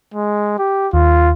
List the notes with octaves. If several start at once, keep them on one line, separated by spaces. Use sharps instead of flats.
G#3
G4
D#2 F4